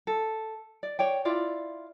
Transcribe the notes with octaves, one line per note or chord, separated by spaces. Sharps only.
A4
D5
C#5 D5 G5
E4 F4 D5